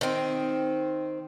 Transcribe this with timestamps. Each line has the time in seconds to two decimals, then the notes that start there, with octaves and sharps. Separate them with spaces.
0.01 D#3 C4